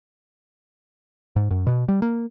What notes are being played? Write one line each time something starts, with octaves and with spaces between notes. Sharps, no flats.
G#2
F#2
B2
G3
A#3